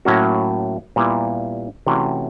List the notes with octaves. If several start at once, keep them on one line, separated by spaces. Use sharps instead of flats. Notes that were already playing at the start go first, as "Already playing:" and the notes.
A2 F#3 A#3 C#4 F#4
A#2 G3 B3 E4
C3 E3 A3 C#4 F#4